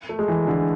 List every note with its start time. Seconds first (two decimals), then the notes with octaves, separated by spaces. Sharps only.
0.09 A3
0.19 G#3
0.28 E3
0.47 D3